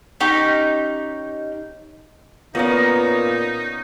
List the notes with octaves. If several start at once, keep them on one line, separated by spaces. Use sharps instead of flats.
C#4 D#4 G4
A#2 B3 C#4 D#4 A#4 C#5 D#5